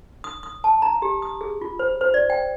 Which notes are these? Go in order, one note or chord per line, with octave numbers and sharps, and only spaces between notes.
D#6
D#6
A5
A#5
G4
D#6
G#4
F4
C5
C5
D5
G5